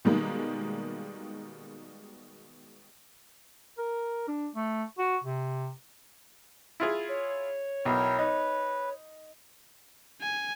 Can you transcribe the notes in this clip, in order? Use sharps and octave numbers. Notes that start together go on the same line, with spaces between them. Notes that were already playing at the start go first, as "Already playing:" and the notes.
B2 D#3 G3 G#3 A#3
A#4
D4
A3
F#4
C3
E4 F4 G#4
C#5
B1 E4 A#4 G5
D#4 B4
G#5